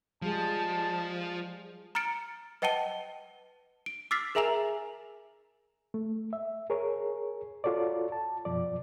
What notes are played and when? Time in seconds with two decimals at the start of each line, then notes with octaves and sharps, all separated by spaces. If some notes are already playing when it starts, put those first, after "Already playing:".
0.22 F3 G3 G#3 G#4 A5
1.95 A#5 F6 A6 C#7 D7
2.62 B4 D#5 F#5 G5 A5 G7
3.86 D7
4.11 D6 E6 F6 A6 B6 C7
4.35 G#4 A#4 E5 G#5 A#5 F7
5.94 A3
6.33 E5
6.70 G#4 A#4 C#5
7.64 F4 F#4 A4 C#5 D5
8.12 A5
8.45 F#2 B2 F3 D5